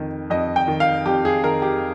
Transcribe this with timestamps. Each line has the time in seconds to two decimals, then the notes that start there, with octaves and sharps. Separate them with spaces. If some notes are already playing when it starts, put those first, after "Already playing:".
Already playing: F2 D#3
0.30 F2 D#5
0.56 G5
0.68 D#3
0.80 F5
1.05 F2 G4
1.25 G#4
1.44 D#3 A#4
1.62 G4